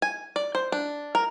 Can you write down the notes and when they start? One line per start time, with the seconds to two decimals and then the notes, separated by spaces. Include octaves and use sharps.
0.02 G#5
0.36 D5
0.55 C5
0.72 D4
1.15 A#4